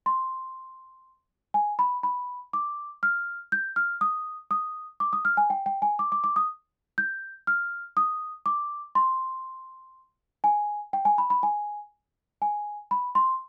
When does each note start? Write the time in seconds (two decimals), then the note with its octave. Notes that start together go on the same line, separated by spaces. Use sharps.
0.06 C6
1.54 G#5
1.79 B5
2.03 B5
2.53 D6
3.03 F6
3.52 G6
3.76 F6
4.01 D#6
4.51 D#6
5.00 D6
5.13 D#6
5.25 F6
5.37 G#5
5.50 G5
5.66 G5
5.82 G#5
5.99 D6
6.12 D6
6.24 D6
6.36 D#6
6.98 G6
7.47 F6
7.97 D#6
8.46 D6
8.95 C6
10.44 G#5
10.93 G5
11.05 G#5
11.18 B5
11.30 B5
11.43 G#5
12.42 G#5
12.91 B5
13.15 C6